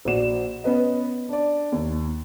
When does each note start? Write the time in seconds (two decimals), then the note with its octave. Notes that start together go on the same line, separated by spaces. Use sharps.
0.05 A#1 F#4 D5 E7
0.64 B3 C#4 B4 D#5
1.29 D4 D5
1.72 D#2